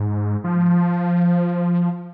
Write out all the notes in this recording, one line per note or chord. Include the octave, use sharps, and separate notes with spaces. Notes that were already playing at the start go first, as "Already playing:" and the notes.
Already playing: G#2
F3